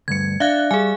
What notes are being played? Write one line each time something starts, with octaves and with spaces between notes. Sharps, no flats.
D2 G2 G#6 C#7
D4 E5 F5 F#6
G3 G#4 G#5